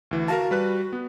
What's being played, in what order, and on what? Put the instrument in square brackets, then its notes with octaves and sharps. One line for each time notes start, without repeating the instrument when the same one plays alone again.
[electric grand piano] D2 E3
[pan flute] F#4 [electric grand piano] A#4 F5 A5
[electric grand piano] G3 B4 F#6
B3